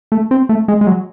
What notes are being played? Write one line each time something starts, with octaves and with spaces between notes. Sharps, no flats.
A3
C4
A3
G#3
G#3
F#3